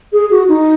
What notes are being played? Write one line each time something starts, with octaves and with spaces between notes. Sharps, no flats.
G#4
F#4
D#4